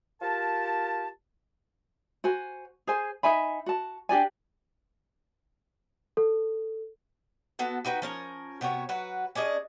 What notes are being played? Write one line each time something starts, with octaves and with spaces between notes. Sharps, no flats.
F4 G4 A#4 A5
F#4 C5 G#5
G#4 C5 G#5
D#4 E5 G#5 B5
F#4 A5
D4 G4 D5 G#5
A4
B3 F#4 A4
D#4 F#4 B4 G5
F3 C#4 A#4
C3 B3 F#4 C#5
F#3 F#4 B4
C#4 D4 G#4 D#5